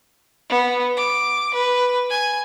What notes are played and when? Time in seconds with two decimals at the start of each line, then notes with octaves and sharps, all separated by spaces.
0.50 B3
0.97 D6
1.54 B4
2.10 G#5